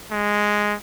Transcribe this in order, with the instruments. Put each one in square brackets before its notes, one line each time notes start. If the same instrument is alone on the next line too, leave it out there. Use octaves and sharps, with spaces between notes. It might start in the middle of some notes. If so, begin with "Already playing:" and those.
[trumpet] G#3